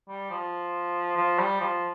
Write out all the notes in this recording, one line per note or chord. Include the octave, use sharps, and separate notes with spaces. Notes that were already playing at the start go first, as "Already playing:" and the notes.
G3
F3
F3
G3
F3